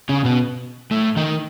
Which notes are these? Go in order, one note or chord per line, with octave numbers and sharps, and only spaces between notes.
C#3 C#4
B2 B3
A2 A3
D#3 D#4